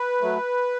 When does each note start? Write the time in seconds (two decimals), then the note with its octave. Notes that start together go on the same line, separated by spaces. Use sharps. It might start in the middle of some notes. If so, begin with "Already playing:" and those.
Already playing: B4
0.21 F#3 A3